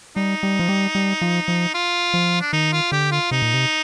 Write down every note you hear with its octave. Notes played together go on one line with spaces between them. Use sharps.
G3 D#4
G3
F3
G3
G3
F3
F3
F4
F3
D4
D#3 D#4
F4
D3 G4
F4
C3 D#4
A#2
C3